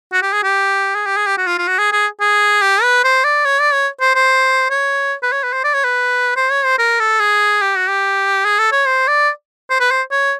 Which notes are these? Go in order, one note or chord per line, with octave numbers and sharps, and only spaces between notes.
F#4
G4
G#4
G4
G#4
G4
G#4
G4
F#4
F4
F4
F#4
G#4
G#4
G#4
G4
B4
C5
D5
C#5
D5
C#5
C5
C5
C#5
B4
C#5
B4
C5
D5
C#5
B4
C5
C#5
C5
A#4
A4
G#4
G4
F#4
G4
G#4
A4
C#5
C5
D5
C5
B4
C5
C#5